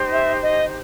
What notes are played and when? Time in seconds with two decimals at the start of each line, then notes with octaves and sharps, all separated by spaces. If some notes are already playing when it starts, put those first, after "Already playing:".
Already playing: D#4 G4 C5
0.12 E5
0.42 D#5